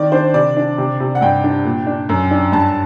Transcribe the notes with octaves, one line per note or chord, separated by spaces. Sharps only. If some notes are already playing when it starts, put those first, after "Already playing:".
Already playing: D#3 C4 D5
D4 C5
C3 D5
D4
C3
C3
F#5
G2 G5
D4
A#2
D4
F#2
D4
G2 A5